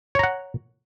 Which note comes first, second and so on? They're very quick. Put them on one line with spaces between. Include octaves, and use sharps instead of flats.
C#5 A#5 F#5